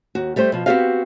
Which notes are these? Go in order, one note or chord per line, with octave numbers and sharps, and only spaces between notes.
D#2 F#4
G3 A3 G4 C5
B2 F3
B3 C4 F#4 G4 D#5 F5